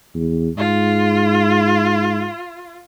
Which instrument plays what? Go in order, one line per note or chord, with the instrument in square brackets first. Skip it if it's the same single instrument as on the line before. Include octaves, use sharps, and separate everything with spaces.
[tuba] E2
[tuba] G#2 [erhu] F4